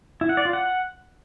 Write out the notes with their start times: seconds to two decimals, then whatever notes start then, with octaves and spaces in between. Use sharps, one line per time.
0.21 E4
0.29 F#5
0.37 D5
0.45 F4
0.53 F#5